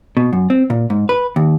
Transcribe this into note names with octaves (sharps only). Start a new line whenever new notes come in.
B2
F#2
C4
A#2
G#2
B4
D#2